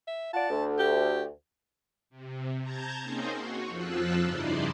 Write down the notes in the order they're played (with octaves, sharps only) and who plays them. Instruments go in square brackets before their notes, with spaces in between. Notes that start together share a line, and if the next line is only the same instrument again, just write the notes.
[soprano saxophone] E5
[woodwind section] F4 D5 F#5 [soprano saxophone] A5
[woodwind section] D2
[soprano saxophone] G4
[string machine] C3
A5 A#5 G6 G#6
A#3 C4 C#4 D#4 G#4 C5
F#4 C#5
F2 F3 F4 E6 F#6
G2 C#3 D#4 E4 D5 C6